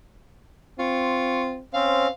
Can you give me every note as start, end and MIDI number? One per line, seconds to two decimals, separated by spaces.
0.79 1.63 60
0.79 1.57 65
0.79 1.42 85
1.74 2.07 60
1.74 2.07 61
1.74 2.11 72
1.74 2.10 77